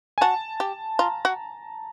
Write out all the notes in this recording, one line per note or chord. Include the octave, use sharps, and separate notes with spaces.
G#5
F#4 A5
G4
F4 A#5
F#4